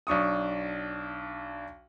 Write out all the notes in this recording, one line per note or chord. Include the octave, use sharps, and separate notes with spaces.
B1 D4 C#6 D#6